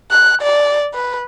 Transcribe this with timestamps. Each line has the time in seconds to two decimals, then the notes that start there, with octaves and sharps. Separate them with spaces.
0.11 F#6
0.41 D5
0.94 B4